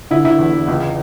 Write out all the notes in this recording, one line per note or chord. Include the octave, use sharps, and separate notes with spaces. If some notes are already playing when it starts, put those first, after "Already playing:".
D3 E4
D3 E4
E2
E2
C#2